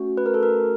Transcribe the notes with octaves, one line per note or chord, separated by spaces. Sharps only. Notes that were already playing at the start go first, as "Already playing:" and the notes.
Already playing: A3 C#4 F#4
B4
A#4
A4
A#4